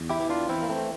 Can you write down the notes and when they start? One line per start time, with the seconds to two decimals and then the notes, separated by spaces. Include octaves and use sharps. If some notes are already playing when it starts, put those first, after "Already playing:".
Already playing: E2
0.09 E4 G4
0.20 E3
0.30 D4 F4
0.49 E3 C4 E4
0.62 A#3
0.69 A3 C4